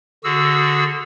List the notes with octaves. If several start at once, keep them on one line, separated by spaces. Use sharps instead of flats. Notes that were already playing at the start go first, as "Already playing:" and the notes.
D3 F#4 G#4 E6